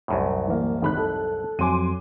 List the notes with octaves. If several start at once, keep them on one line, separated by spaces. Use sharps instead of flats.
C2 F#2 A2
E3 A#3
G#1 B5 F#6
A4
F2 F#3 G#5 C6 D6 D#7